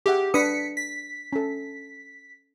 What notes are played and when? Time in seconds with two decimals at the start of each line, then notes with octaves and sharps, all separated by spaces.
0.06 G4 G#4 E5 F#5
0.34 D4 B4 D#6 B6 C#7
0.77 B6
1.33 C#4 A4